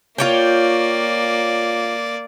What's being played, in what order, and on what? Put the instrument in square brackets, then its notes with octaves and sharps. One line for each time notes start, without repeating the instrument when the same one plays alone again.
[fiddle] A#3 D5 [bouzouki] F4 C#5 G5